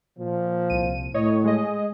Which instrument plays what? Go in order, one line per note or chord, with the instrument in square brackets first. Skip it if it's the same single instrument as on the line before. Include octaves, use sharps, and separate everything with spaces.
[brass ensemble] A#2 F3
[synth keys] C2 D#7
[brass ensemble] A2 [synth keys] C#5 D#5
[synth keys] G#3 G#4 D#5